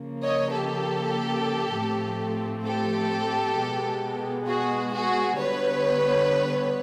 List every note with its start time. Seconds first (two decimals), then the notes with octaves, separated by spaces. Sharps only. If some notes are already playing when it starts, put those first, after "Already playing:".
Already playing: C#3 F3 A#3
0.22 C#5 D#5
0.53 G4 A4
1.74 A2 F3 A3 C4
2.65 G4 A4
3.57 B2 G#3 B3
4.48 F#4 G#4
4.93 F#4 G#4
5.38 D3 G3 B3 B4 C#5